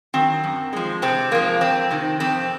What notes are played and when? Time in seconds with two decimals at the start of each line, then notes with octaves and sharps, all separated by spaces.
0.14 D#3 F#3 C4
0.43 F#2
0.73 F3 G#3
1.02 C3 C4
1.31 F3 G#3 A#3
1.61 F2 C4
1.91 C3 D#3
2.20 F2 C4